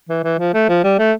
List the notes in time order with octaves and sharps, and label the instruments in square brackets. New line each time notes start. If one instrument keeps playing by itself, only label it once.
[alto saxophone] E3
E3
F3
A3
F3
G3
A3